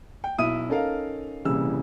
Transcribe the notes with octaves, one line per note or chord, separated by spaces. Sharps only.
G5
B1 E4 E5 D#6 D#7
C#4 D#4 A4 A#4 F5
D#1 C2 C#3 E3 E6